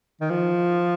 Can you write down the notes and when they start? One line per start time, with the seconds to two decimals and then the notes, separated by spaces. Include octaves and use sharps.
0.21 D#3
0.30 F3